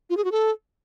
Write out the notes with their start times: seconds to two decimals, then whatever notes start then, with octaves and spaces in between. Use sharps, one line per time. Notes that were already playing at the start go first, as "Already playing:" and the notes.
0.10 F4
0.17 G#4
0.24 F#4
0.32 A4